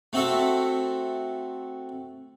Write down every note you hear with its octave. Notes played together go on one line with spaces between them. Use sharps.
A3 C4 F#4 A4 E5